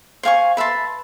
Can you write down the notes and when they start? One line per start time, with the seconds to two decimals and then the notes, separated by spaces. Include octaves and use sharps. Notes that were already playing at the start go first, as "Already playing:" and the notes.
0.23 C5 F5 G#5 C#6
0.57 B4 E5 A5 C6